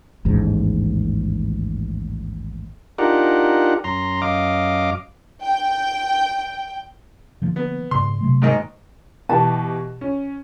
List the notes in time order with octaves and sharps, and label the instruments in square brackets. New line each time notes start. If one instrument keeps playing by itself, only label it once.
[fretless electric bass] A1 D#2 G#2
[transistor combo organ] D4 D#4 F4 G4 A#4 F#5
F#2 A#5 C6
F#2 D#5 F5 D6
[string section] G5
[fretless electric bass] D3 F3 A#3
[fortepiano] B3
[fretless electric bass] G#2 C#3 [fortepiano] C6
[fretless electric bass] C3 F#3 A3
[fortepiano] G#2 D#3 D#5
[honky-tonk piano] B2 E3 G4 [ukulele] A5
[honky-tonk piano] C#4